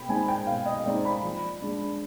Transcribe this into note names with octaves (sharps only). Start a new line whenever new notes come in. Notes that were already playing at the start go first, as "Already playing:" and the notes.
Already playing: B2 G5 B5
G#3 C4 D#4 G#5
G5
B2 F5
D#5
G#3 C4 D#4 D5
B5
F3
G#3 D4